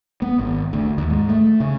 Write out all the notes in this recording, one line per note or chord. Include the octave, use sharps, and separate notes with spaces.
B3
G#1
D2
D#2
G#2
A3
C#3